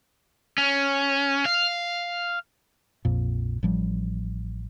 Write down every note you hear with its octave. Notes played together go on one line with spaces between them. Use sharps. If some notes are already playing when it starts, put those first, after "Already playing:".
C#4
F5
A#1 F2 A#2
A1 F3 G3